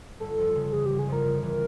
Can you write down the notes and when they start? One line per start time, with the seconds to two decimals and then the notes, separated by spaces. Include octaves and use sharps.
0.20 G1 A4
0.38 F2
0.55 C#3
0.73 E3 G#4
0.86 G1 G4
0.99 G#4
1.08 F2 A#4
1.25 C#3
1.43 E3